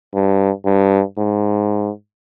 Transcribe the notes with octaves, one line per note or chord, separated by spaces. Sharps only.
G2
G2
G#2